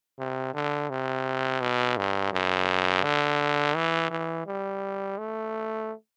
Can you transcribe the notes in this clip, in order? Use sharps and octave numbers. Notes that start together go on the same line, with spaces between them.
C3
D3
C3
B2
G2
F#2
D3
E3
E3
G3
A3